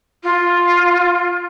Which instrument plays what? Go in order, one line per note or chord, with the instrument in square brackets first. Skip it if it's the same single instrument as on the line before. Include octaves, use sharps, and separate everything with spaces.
[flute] F4